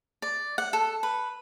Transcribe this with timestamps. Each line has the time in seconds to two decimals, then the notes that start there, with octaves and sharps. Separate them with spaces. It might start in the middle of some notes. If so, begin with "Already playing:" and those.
0.22 D5
0.58 F#5
0.73 A4
1.03 B4